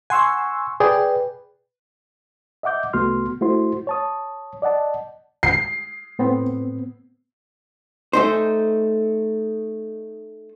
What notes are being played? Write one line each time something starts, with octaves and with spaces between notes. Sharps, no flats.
F#5 G#5 C6 C#6 E6
G#4 B4 D5 G5
D#5 E5 F#5 D6 G6
C2 A3 B3 F#4 C6 F6
A3 E4 F#4 C5 C6
C#5 A5 D#6
D5 D#5 F#5 A5
C7
A2 B3 C4
A3 D#4 C5